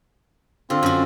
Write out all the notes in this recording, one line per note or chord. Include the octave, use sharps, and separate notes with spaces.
D3 C4 F4
F#2 F#4